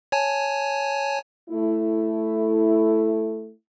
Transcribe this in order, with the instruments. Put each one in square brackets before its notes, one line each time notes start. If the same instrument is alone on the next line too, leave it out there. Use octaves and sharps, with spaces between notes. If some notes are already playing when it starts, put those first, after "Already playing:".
[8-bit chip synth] C#5 G#5 A5
[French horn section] A3 E4